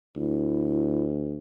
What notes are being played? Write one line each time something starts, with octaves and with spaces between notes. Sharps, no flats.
D2 E4